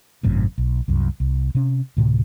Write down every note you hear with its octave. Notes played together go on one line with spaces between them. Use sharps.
G#1 F#2 A2 C3
B1
C2 F#2
C2
C3 C#4
D2 A2 C3